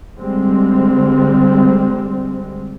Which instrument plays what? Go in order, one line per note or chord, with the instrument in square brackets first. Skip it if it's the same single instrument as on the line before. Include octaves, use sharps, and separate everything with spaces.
[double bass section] D3 G3 G#3 C4